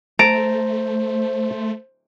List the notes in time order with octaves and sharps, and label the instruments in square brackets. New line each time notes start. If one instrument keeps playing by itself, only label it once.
[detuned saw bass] A3 [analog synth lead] C5 [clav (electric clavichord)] A5 A#5 [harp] D7